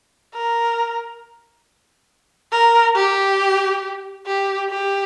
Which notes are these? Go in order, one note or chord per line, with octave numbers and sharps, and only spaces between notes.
A#4
A#4
G4
G4
G4